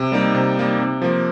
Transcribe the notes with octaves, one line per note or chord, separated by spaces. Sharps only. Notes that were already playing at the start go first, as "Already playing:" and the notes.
Already playing: C3
G3 A#3 D#4
C3
G3 A#3 D#4
C3
F3 A#3